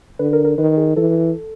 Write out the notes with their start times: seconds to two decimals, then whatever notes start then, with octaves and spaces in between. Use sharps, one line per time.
0.19 D3 B4
0.33 A#4
0.45 A#4
0.58 D#3 B4
0.77 G#4
0.96 E3 A4